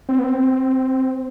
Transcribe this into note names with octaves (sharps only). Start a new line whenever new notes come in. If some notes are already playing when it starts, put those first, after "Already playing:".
C4
B3
C4